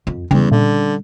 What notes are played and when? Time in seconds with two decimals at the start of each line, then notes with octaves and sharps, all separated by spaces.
0.07 F2
0.31 E2 C#3 G3 C#4
0.51 A#2 D3